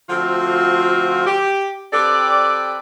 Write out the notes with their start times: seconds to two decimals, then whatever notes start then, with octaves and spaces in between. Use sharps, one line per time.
0.09 D3 F3 A3 C4 F4 F#4
1.26 G4
1.93 C4 G4 A4 B4 D5